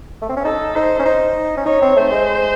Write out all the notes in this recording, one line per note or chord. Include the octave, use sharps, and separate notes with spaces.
A3
C4
C#4
D#4 A4
D#4 C5
C#4
D#4
C#4
D#4 C#5
C4
A3 C5
G#3